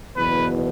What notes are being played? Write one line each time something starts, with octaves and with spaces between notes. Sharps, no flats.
F#1 E2 B2 B4